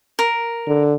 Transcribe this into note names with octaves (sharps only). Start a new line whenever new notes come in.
A#4
D3